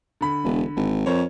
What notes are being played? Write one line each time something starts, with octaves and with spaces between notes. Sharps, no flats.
D3 B5
E1
G#1
F2 A#4 C5 C#5